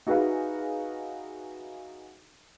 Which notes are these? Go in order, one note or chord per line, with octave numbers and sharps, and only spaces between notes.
D#4 F#4 G#4 B4 E5 F5